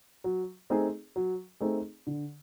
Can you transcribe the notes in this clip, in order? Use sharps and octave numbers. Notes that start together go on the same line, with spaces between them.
F#3
A3 C4 D#4 G#4
F#3
A3 C4 D#4 G#4
D3